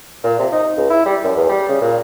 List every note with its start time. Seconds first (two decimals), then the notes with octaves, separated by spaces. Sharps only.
0.24 A#2
0.39 C3
0.52 D#4
0.77 C#2
0.90 E4
1.06 G3
1.24 F#2
1.36 E2
1.49 G3
1.69 C#3
1.81 A#2